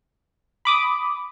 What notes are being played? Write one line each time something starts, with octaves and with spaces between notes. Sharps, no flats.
B5 D6 D#6